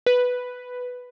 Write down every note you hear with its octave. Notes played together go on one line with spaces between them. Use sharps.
B4